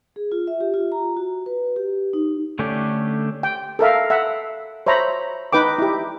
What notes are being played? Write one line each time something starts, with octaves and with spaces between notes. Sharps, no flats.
G#4
F4
E5
G4
F4
A#5
F#4
B4
G4
D#4
D3 A3 C#4 D4 G4
G5
A4 A#4 E5 F5
E5 F#5
C5 C#5 E5 A#5 B5
D#4 B4 G5 D6
E4 G4